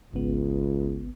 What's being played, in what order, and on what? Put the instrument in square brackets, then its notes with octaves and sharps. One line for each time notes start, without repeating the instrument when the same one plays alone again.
[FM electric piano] G#1 B3 [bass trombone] C#2